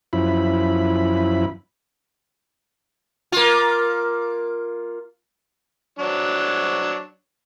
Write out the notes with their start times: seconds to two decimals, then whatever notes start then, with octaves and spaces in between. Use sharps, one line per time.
0.13 F#2 F3 E4 B5
3.32 A#3 F4
5.99 F#3 D4 C#5